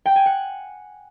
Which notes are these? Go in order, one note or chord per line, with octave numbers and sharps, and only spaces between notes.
G5
G#5
F#5